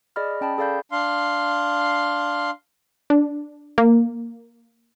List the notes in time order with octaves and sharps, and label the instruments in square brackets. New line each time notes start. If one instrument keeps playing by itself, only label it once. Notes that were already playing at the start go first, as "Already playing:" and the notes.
[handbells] G#4 D5 D#5 B5 F6
C#4 G5 A5 B5
G#4 A4 D5 F5 B5 G6
[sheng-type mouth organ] D4 F5 C6
[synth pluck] D4
A#3